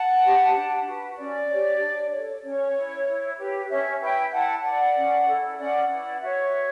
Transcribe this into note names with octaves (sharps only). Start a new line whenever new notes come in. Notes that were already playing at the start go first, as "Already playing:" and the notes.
Already playing: F#5 A5
G4 B4
D4
F#4 B4
C#4 D5
G4 C#5
D4
A4 C#5
C#4 C#5
E4 B4
E4
G4 B4
C#4 C#5 E5
E4 B4 E5 G5
E4 F#5 A5
B4 D5 F#5
C#4
E4 A4
C#4 D5 F#5
E4 B4 D5 F#5
F#4 C#5 E5
B4